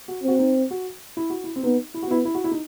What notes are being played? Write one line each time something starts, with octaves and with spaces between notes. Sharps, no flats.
F#4
C4 F#4
D#4
F#4
E4
F#4
E4
C4
B3 D#4
E4
F#4
B3 E4
E4
F#4
E4
D#4